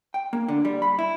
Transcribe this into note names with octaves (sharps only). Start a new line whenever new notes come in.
G5
A#3
D3
G3
B5
E4